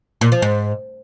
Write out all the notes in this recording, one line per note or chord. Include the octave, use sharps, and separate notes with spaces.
A#2
F3
G#2